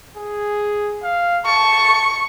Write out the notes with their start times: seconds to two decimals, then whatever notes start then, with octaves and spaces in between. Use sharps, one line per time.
0.17 G#4
1.03 F5
1.46 A5 C#6